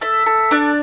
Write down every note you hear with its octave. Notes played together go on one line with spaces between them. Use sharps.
A4 E5
A4
D4 D5